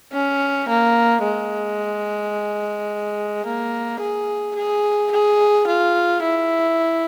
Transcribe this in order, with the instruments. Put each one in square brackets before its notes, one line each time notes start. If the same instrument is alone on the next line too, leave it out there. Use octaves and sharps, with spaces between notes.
[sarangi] C#4
A#3
G#3
A#3
G#4
G#4
G#4
F4
E4